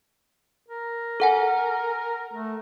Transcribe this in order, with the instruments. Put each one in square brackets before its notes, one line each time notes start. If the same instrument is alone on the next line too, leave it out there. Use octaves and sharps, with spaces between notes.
[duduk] A#4
[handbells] A4 F#5 G#5
[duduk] A3